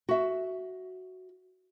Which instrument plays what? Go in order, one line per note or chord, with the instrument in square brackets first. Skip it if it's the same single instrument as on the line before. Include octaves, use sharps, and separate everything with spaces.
[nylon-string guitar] F#4 E5